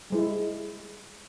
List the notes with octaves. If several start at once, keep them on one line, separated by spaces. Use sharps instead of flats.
G3 G#3 E4